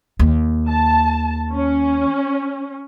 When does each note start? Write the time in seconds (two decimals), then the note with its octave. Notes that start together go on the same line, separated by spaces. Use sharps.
0.19 D#2
0.69 A5
1.52 C#4